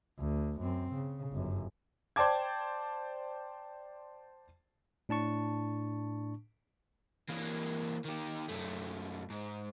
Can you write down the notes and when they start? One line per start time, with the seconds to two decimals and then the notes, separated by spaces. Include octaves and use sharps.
0.19 D2
0.60 F#2 C4
0.93 C#3
1.32 G1 F#2
2.16 C5 D5 G5 A5 D6 G#6
5.09 A2 D4 A5 C#6
7.29 E3 A#3
8.05 D#3 G4
8.48 F#2 A3
9.30 G#2